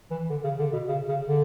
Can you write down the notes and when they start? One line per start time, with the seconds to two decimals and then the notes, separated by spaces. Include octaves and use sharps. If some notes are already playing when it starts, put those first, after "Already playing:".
0.11 E3
0.30 D3
0.44 C#3
0.59 D3
0.73 B2
0.88 C#3
1.08 C#3
1.28 D3